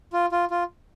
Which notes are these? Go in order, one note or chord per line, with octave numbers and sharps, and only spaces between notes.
F4
F4
F4